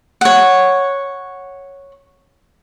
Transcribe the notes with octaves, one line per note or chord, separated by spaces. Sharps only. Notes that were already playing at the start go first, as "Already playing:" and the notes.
C#5 F#5